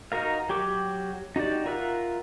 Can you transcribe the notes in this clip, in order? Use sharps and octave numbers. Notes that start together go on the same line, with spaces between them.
D#4 F#4 A#4 F5
F#3 G4 C#6 D6
D#4 F#4 G4 D5
F4 A#4 E5 F#5